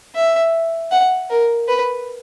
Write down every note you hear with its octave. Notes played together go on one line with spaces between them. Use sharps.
E5
F#5
A#4
B4